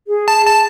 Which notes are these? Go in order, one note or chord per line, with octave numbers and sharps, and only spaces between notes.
G#4
A5
A5